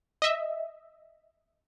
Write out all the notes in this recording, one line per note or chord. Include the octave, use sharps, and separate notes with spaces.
D#5 E5